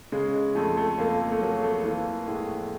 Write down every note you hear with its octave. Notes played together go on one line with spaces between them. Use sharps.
C#3 G#3
G#3
F2 A3
A3
F2 A#3
A3
F#3 A#3
A3
E3 A#3
A2 G#3